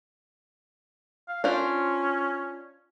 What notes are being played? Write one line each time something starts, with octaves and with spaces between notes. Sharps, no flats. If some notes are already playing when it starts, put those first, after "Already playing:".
F5
C#4 D4 F4 C5